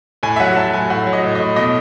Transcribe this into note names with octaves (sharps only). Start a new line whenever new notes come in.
A2 G#5
E5
F#3 F#5
F#3 A5
A2 G#5
A2 F#5
F#3
D#5
A2
D#5
A2
B2 D#5